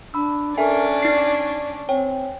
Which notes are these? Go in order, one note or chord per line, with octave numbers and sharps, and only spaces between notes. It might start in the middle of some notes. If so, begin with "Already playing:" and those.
D4 B5 E6
C#4 D4 A4 A#4 E5 G#5
D#4 D5 C7
C4 C#5 G5 G#5